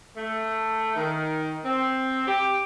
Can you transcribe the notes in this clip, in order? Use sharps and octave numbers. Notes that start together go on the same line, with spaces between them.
A3
D#3
C4
G4